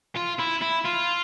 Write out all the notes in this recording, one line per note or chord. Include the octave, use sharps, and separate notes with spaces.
F4
E4
E4
F4